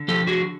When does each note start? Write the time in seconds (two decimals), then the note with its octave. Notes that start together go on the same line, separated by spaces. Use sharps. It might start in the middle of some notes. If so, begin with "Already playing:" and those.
Already playing: D3
0.08 F3 G4 A4
0.27 F#4 G#4